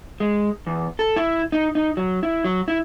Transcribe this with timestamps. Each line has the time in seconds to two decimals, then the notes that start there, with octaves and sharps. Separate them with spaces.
0.20 G#3
0.67 E2
0.99 A4
1.16 E4
1.52 D#4
1.75 D#4
1.97 F#3
2.23 E4
2.45 F#3
2.68 E4